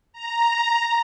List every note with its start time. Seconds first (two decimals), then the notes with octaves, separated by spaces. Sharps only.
0.13 A#5